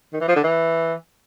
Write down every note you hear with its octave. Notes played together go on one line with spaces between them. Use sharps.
D#3
E3
F3
D3
E3